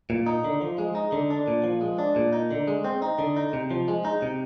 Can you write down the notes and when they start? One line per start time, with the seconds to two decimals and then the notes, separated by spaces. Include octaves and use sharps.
0.10 A#2
0.26 D#4
0.44 D3
0.61 F3
0.78 G#3
0.95 D#4
1.12 D3
1.30 D4
1.48 A#2
1.64 F3
1.81 G#3
1.98 D4
2.16 A#2
2.33 D#4
2.51 D3
2.68 G#3
2.84 C4
3.02 D#4
3.19 D3
3.37 D#4
3.53 C3
3.71 F3
3.88 G#3
4.05 D#4
4.22 C3